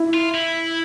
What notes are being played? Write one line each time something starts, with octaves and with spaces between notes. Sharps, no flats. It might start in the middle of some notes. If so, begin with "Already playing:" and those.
Already playing: E4
F4
E4